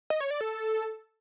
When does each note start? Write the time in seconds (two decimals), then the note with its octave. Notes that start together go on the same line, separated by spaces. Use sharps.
0.10 D#5
0.20 C#5
0.31 D5
0.41 A4